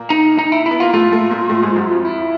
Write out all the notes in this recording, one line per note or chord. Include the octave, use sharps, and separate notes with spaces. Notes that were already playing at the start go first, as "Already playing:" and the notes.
Already playing: A#2 A#3
D#4
D#4
E4
E4
B3
A#3 F4
A2 A3 F4
A2 A3
A#2 A#3
A2 A3
G#2 G#3
F#2 F#3
F2 F3
E4